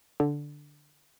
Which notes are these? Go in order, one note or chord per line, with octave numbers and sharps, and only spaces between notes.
D3